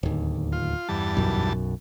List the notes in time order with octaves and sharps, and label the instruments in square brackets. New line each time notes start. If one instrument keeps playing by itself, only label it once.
[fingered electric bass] D1 D#2
[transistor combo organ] F4
E2 G2 A5
[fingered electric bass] B1 F#2